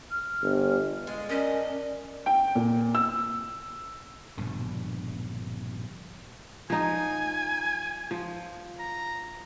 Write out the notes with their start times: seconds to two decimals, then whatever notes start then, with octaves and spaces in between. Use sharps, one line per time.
0.11 F6
0.42 G1
1.07 G#3 F4
1.29 C#4 D4 A#4 D#5
2.26 G5
2.55 A#2
2.95 E6
4.38 A#1 G2 B2 D3
6.70 F3 D#4 G#5
8.11 F3
8.79 A#5